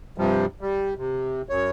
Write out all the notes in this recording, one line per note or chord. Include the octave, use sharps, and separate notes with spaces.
G2 C3 F3 G3
G3
C3
F#2 C#5